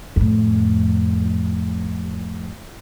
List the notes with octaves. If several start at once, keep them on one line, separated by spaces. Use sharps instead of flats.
F2 A2